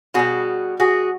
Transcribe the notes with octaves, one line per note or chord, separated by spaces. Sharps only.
B2 G3 F#4 G#4
F#4 G#4